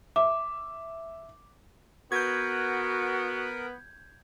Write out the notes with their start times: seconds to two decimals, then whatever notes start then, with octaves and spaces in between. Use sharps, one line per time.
0.16 E5 D6
2.12 B3 F#4 A#4 G6 G#6